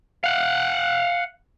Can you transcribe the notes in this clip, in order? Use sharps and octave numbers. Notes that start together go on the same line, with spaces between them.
F5 F#5